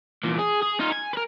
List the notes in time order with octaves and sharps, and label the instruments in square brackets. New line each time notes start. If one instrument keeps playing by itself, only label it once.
[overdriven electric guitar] E2 A#2
G#4
G#4
D#4 F4
G#5
A#4 B4